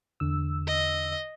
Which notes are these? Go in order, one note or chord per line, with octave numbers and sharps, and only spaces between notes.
E2 D3 E6
D#5